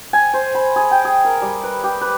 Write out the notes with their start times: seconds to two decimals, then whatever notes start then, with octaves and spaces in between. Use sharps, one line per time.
0.13 G#5
0.34 C5
0.55 B5
0.76 G#4
0.91 G5
1.05 G#4
1.25 A#4
1.42 G3
1.63 B4
1.84 G4
2.01 B4